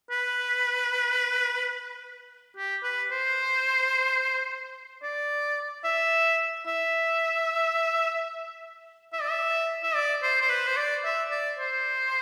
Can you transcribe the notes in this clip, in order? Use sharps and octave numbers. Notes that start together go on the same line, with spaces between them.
B4
G4
B4
C5
D5
E5
E5
E5
D5
E5
E5
D5
C5
C5
B4
C5
D5
E5
D5
C5